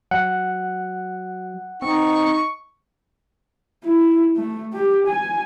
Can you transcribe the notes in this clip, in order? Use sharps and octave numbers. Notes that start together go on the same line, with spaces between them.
F#3 F#5
C4 D#4 C#6
E4
A3
G4
G#5